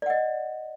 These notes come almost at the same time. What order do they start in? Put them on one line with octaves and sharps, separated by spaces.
D5 F#5 D#5